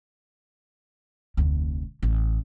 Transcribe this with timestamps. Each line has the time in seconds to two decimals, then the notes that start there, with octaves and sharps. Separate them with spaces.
1.37 F1 D2
2.03 A1